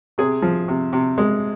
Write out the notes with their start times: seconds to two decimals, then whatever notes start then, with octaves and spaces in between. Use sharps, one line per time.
0.18 C3 G#4
0.42 F3
0.68 C3
0.93 C3
1.18 G#3